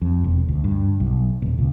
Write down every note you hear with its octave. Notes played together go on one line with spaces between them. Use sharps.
F2
E1
D2
G2
B1
D#1
C#2